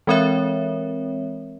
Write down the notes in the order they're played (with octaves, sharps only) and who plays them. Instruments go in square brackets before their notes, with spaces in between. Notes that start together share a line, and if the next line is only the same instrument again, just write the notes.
[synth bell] E3 G#3 C4 A#4 C#5 E5